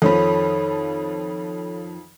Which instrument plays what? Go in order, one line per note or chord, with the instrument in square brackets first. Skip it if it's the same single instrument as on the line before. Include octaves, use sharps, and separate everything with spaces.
[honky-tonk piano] F2 D#3 F3 [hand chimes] A4 C#5 B5